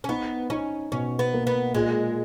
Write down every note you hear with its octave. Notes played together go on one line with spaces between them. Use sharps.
C#4
B3 D#4
C#4 D#4
B2 C#4
B3
A#3
B3
A#2 G#3